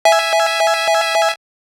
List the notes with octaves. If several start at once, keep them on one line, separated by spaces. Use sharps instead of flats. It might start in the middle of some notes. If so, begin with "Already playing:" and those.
E5 G#5